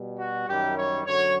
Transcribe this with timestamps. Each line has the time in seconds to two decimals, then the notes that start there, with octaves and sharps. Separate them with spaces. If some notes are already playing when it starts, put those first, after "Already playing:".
Already playing: B2 G3
0.20 F#4
0.48 F#2 D#3 G3 G4
0.77 C#5
1.04 F#2 D3 F#3 C#5